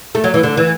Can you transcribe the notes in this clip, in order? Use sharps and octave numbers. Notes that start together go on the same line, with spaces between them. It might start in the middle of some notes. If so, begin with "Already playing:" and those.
A3
F#3
E3
D3
E3